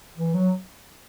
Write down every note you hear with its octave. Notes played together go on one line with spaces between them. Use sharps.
E3
F#3